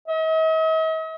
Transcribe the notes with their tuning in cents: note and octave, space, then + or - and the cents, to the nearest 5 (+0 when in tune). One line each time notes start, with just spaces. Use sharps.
D#5 +45